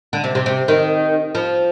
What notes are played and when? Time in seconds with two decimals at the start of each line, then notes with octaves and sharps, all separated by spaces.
0.13 D3
0.24 C3
0.35 C3
0.46 C3
0.68 D#3
1.35 F3